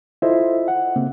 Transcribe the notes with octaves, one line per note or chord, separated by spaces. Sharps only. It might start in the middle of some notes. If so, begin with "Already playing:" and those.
E4 F4 A4 C5 D#5 E5
F#5
C#3 A#3 C4